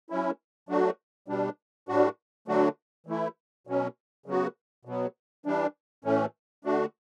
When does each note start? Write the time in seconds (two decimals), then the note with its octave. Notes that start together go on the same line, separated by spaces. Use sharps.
0.10 F#3 C#4 E4
0.69 F#3 A3 D4 F#4
1.28 B2 G3 D4
1.88 A2 G3 D4 F#4
2.48 D3 F#3 A3 D4 F#4
3.07 E3 A3 E4
3.67 B2 F#3 C#4
4.26 C#3 F#3 B3 F#4
4.85 B2 F#3 B3
5.46 E3 G3 D4
6.04 A2 E3 A3 C#4
6.65 D3 A3 D4 F#4